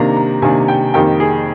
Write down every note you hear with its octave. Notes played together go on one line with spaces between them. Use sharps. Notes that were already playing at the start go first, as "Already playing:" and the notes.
Already playing: C3 D#3 A#3 D4 A#5
A#5
C3 D#3 A#3 D4 G#5
G5
F2 D#3 G3 A#3 G5
G#4